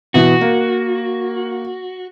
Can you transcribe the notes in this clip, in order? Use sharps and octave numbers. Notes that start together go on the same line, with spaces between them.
B2 E3 B3 F#4
A#3